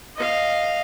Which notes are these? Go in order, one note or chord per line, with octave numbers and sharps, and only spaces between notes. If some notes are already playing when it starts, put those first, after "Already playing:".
D#5 F5